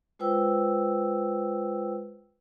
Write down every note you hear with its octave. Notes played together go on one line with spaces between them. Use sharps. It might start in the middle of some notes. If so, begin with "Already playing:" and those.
G#3 F4 B4 C5 G5 E6